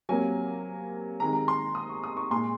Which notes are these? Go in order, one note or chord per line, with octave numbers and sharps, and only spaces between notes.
C3 F#3 A#3 G#5
C3 D#3 G#3 A#5
A#5
C6
D#6
C#6
D#6
C#6
A#2 G#3 C6